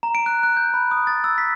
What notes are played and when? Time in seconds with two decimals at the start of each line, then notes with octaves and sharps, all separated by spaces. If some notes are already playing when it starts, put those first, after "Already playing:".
0.03 A#5
0.15 D7
0.26 F#6
0.43 F#6
0.57 G6
0.74 B5
0.91 D#6
1.07 A6
1.24 E6
1.38 B6